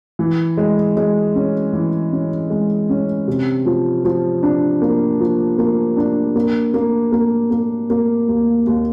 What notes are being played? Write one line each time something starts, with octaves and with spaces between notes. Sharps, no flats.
E3
G#3
G#3
C#4
E3
C#4
G#3
C#4
C3
F3
F3
D4
A#3
F3
A#3
D4
A#3
A#3
A#3
A#3
A#3
D#2
D#2